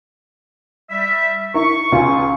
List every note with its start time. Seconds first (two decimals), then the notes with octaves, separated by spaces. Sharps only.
0.90 G3 E5
1.54 E4 A#4 C#6
1.92 C#2 F4 G#5